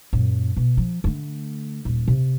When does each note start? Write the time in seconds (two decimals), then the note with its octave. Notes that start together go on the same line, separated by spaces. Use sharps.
0.13 F#2 A#2
0.57 B2
0.77 F3
1.04 D3 A3
1.85 D#1
2.08 C3